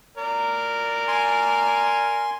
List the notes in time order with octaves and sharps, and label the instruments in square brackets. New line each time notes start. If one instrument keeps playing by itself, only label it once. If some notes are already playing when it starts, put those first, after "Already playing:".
[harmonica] A#4 D5
[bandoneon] G#5 C6